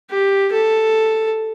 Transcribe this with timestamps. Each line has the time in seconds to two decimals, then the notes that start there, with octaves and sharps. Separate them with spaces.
0.10 G4
0.52 A4